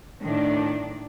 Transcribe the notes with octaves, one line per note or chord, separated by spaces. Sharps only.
A2 D#3 D4